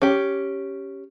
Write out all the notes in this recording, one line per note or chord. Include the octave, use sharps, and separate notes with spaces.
C#4 G4